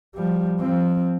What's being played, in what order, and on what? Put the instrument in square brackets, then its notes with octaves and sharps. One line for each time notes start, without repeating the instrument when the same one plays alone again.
[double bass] F3 G3
F3 C4